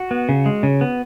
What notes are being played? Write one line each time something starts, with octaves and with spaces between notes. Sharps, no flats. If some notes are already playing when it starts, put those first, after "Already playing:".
Already playing: F#4
B3
C#3
G#3
C#3
B3